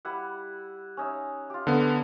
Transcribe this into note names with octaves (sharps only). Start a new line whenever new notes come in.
G3 E4 F#5
C#4 D#4 E5
F4 G4
D3 B3